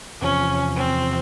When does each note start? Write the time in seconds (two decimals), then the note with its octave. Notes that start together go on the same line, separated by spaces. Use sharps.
0.21 E2 C3 F3 C#4
0.76 C4